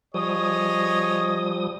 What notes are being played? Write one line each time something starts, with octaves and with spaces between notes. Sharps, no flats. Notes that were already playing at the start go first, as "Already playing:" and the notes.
F3 G3 G#4 C#5 D#5 D#6